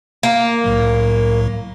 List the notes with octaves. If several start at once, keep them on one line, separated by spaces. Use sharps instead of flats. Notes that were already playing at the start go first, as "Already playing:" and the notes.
A#3
C2 A2 F#3